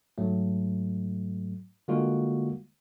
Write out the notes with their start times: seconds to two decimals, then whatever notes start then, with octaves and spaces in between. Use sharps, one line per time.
0.18 G#2 F#3 A3
1.88 D3 G3 G#3 A#3 F4 F#4